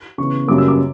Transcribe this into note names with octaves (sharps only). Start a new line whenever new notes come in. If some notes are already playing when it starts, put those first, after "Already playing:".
C#3 E3 B3 C#6
F#2 C#3 G3 A#3 D6
E6
D6